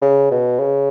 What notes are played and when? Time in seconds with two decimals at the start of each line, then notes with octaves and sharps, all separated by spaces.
0.02 C#3
0.31 B2
0.59 C#3